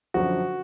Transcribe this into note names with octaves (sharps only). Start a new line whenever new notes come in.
F#2 D3 F3 F#4